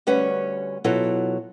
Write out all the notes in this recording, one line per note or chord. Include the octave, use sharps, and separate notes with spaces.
D2 G3 C#4 B4 F#5
B2 F#3 E4 F4 A4